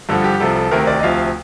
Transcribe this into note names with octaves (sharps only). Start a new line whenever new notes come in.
G2 D3 F3 A4
G4
C2 C3 F3 A4
A4
D2 C3 D#3 A#4
D5
D#5
D2 C3 F3 F5